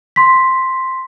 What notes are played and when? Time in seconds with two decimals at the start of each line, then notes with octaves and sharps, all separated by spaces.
0.16 C6 B6